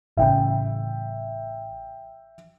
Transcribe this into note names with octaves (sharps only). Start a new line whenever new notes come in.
A1 C#3 E5 G5